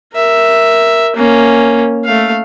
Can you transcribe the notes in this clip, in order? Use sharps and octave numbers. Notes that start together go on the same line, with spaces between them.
A#4 E5
A#3 C#4
A3 F5